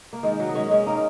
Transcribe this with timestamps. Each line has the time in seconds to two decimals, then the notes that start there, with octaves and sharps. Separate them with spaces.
0.13 A#3
0.23 D#3 G#3
0.40 F#3
0.49 D#4
0.55 G#3 C#4
0.71 G#3 C#4
0.86 A#3 D#4